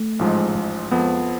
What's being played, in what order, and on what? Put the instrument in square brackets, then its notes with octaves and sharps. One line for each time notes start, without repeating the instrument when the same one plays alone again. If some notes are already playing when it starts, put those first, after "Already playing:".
Already playing: [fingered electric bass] A3
[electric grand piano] A1 G#2 F3 G#3
[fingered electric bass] G#3
[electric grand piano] F2 F3 B3